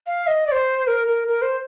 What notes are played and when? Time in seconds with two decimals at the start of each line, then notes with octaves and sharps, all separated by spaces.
0.07 F5
0.27 D#5
0.47 D5
0.52 C5
0.87 A#4
1.08 A#4
1.28 A#4
1.42 C5